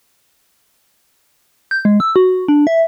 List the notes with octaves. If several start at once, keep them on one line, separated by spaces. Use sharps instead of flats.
G6
G#3
E6
F#4
D4
E5